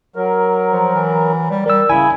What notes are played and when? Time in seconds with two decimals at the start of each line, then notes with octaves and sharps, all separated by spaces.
0.16 F#3 A#4
0.72 F3
0.95 E3
1.50 G3
1.66 G3 A#4 E6
1.90 C#3 E4 G#5